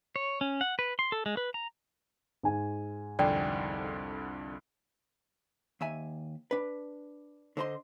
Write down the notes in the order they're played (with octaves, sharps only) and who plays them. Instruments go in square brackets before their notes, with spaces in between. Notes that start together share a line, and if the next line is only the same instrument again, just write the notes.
[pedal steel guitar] C#5
C#4
F#5
B4
C6
A4
G#3
B4
A#5
[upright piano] G#2 G#5
[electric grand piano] C2 F2 D3 [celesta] D5 G5
[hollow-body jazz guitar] D#2 E5 G#5
D4 B4
D3 D4 C5 D#5 C6